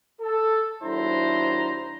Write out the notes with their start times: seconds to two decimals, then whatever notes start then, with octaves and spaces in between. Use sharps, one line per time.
0.21 A4
0.83 D#2 F#3 D4 E4 C5 A#5